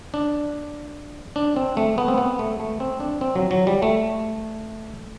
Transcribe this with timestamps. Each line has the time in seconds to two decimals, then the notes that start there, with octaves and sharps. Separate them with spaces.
0.14 D4
1.36 D4
1.56 C4
1.77 A3
1.98 B3
2.08 C4
2.18 B3
2.39 A3
2.60 A3
2.80 C4
3.00 D4
3.21 C4
3.35 F#3
3.51 F#3
3.67 G3
3.82 A3